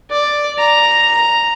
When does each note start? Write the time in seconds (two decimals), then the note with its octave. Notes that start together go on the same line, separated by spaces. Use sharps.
0.11 D5
0.58 A#5